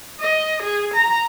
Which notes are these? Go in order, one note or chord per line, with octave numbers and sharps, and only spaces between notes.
D#5
G#4
A#5